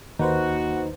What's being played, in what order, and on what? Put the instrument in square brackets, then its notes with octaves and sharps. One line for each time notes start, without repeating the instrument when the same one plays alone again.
[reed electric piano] D#2 [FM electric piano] A#3 B4 C5 [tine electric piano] D#4 [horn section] F#4